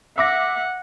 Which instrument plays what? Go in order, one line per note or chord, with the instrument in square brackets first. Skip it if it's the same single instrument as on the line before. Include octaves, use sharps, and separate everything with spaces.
[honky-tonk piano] E5 D6 A#6 [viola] F#5